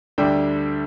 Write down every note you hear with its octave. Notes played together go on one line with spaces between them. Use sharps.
D2 D3 G3 D4 G5